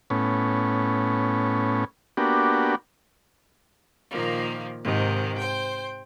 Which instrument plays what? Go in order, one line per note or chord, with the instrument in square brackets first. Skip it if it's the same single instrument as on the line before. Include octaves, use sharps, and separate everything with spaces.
[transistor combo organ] A2 B3 C#4
A#3 B3 D4 F#4 G4
[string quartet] A#2 D#3 F3 A#3
G#2 C3 D#3
C5 G5